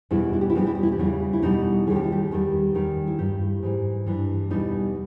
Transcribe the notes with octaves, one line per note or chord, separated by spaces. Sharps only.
E2 B2 G3 E4
E4
G4
E4
E2 B2 G3 G4
E4
G4
E4
G4
E2 C#3 E3 G3 E4
E4
E2 B2 G3 D#4
D#2 D#3 G3 G#4
G4
E4
G4
E2 D#3 G3
E2 D#3 G3
E4
G2 G3 G4
G#2 E3 G3
G2 E3 G3
E2 B2 G3 D#4